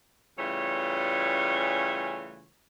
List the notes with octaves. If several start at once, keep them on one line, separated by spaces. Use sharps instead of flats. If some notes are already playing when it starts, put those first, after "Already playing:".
C#3 E3 G3 A3 F4 C#5